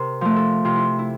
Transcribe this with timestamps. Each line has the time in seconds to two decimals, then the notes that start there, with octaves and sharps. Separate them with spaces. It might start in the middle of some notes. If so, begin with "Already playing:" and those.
Already playing: C3 A#4 C5
0.21 F3 A3
0.36 A4
0.65 C3 F4
0.76 E4
0.99 E4